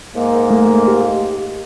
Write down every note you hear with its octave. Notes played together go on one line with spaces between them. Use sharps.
G#2 A#3
A3
G4